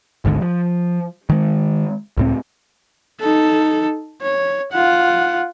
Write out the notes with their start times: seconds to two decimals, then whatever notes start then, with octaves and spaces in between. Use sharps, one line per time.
0.25 G#1 D2 G#2 D3
0.42 F3
1.30 D#3 G#3
2.17 C#2 A2 C4
3.20 D#4 A4
4.22 C#5
4.72 F4 F#5